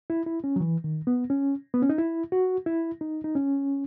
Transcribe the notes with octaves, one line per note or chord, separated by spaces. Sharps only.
E4
E4
C#4
F#3
E3
D#3
B3
C#4
B3
C#4
D#4
E4
F#4
E4
D#4
D#4
C#4